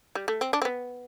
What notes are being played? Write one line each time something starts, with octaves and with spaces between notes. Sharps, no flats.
G3
A3
C4
D4
C4
B3